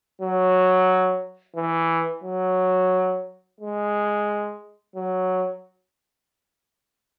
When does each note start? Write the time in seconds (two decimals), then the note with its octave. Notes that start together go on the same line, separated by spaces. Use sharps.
0.22 F#3
1.56 E3
2.24 F#3
3.61 G#3
4.96 F#3